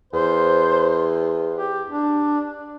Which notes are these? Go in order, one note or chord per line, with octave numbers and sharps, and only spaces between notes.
E2 C5
G4
D4